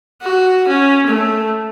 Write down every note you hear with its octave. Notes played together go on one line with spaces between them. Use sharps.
F#4
C#4
A3